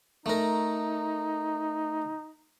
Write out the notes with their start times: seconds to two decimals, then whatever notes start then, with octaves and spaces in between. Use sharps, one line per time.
0.26 A3 D#4 A#4